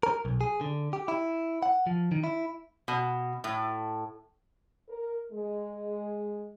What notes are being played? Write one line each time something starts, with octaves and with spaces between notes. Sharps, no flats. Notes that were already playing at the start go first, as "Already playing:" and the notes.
A#4
B1
G#4
D3
G4
E4
F#5
F3
D#3
E4
B2
A2
A#4
G#3